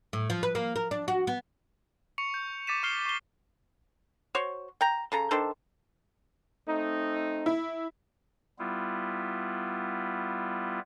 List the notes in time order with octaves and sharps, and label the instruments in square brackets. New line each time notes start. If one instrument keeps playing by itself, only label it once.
[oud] A2
F3
B4
A#3
A#4
D4
F#4
B3
[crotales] C#6 C#7 F7
G6
D6 A6 B6 D#7 E7
C#6 F6 C7 F7 G7
C#6 G7
[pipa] F#4 C5 C#5
G5 A#5
C#3 A4 A#5
D#3 D4 A4 C5
[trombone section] A3 C4 D#4
[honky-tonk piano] E4
[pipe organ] G3 B3 E4 F4